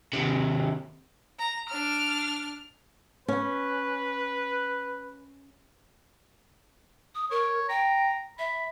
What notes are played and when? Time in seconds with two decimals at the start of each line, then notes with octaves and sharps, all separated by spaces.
0.14 D#2 C3
1.39 A#5
1.69 D4 F6
3.28 C#4 B4
7.15 D#6
7.31 A#4 C#5
7.69 G5 A#5
8.39 E5 B5